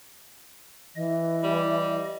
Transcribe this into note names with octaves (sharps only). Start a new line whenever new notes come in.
E3 D#5
G3